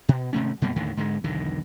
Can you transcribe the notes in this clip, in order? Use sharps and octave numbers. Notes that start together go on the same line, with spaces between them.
B2
G#1 C3 A3 C#4
F#2 B2 G3 A#3
D#2 A2 D3 D#3
G#2 D3 G#3
B1 E2 D3 D#3